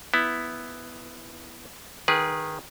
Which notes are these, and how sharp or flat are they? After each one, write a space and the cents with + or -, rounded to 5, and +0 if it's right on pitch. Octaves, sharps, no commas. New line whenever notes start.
B3 +0 E4 +0
D#3 +0 G#4 -10 B4 -25